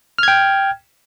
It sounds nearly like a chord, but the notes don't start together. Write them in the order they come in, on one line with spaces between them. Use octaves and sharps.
F6 G#6 G5